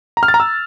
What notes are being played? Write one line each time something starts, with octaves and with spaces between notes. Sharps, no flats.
A#5
F6
A6
A#5
E6